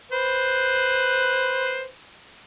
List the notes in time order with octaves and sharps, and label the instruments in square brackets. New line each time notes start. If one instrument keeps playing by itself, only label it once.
[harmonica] B4 C5